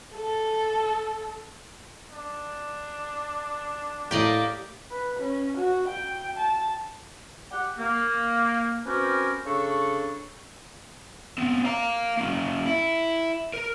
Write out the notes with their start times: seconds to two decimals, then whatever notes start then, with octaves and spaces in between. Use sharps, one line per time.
0.15 A4
2.11 D4
4.11 A2 A#3 G4 D5 D#5
4.91 B4
5.19 C#4
5.57 F#4
5.88 G5
6.37 A5
7.52 G4 F#5
7.78 A#3
8.86 C4 C#4 F#4 G4 A#4 B4
9.46 C#3 D4 A4 C#6
11.38 B3 C4
11.65 F5 A#5
12.17 A#3 C#4
12.66 E4
13.54 A#4